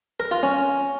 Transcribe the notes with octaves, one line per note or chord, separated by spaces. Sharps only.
A#4
F4
C#4